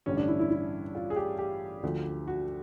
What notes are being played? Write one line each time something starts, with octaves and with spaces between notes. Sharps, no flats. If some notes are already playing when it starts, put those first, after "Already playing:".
A1 G2 D3 G3 C#4
D4
E4
E4
E4
F4
G#4
G4
G4
D2 D3 F3
F#4